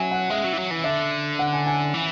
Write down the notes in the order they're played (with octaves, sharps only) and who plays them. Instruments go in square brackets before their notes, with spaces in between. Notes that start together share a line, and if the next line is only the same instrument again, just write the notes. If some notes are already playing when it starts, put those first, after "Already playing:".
Already playing: [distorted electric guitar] F#3 [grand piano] E5 G#5
[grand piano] F#5
[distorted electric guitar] G#3 [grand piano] E5
[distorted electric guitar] F#3
E3
F#3
E3
[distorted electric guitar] D3 [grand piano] E5
[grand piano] F#5
G#5
G#5
[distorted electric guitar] E3